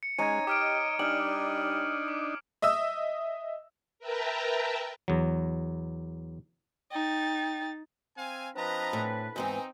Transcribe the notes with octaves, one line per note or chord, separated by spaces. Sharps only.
C#7
G#3 C#4 D#4 C#5 G#6 D#7
G4 D#5 D6 F6 D7
G3 D4 D#4 G#5 F6 F#7
D6
D#5 E5 D#6 E6
A#4 B4 E5 G5 A5 A#5
E2 F#3
D#4 G5 A6
C4 F5 G#5
F3 C4 D4 B4 D#5 A#5
A2
E2 G#2 E3 C4 D#4